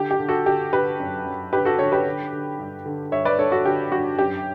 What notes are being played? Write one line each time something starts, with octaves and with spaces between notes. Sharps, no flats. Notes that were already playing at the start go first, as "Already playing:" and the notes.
Already playing: D3 G4
G4
D3
F#4 A4
D3 G4
D3 G4 B4
F#2
F#2
D3 G4 B4
F#4 A4
D3 A4 C#5
G4 B4
D3
D3
G2
D3
G2 C#5 E5
B4 D5
G2 A4 C#5
F#4 A4
D3 G4
G2 F#4
F#2 G4